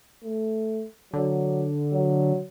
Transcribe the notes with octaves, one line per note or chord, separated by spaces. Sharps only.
A3
D3 F#3
F#3